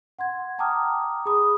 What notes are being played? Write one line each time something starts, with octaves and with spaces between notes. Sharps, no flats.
F#5 C6 G#6
G5 A5 A#5 D6 D#6 F6
G#4 B5 D#6